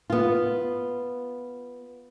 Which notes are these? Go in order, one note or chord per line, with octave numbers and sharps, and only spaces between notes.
B3 F4